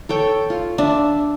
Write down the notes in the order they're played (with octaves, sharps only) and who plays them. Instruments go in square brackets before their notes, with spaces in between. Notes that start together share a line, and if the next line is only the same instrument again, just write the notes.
[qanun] A4 C#5 G5
F4
D4 E5